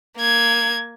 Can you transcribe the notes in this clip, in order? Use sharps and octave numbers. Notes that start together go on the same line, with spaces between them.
A#3 G#6